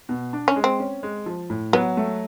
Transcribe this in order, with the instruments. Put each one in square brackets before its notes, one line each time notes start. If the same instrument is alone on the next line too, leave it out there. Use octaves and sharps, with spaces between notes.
[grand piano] B2
D4
[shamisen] C#4
[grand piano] G#3
[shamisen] C4
[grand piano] C#4
G#3
F3
A2
[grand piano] F#3 [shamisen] B3
[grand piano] A3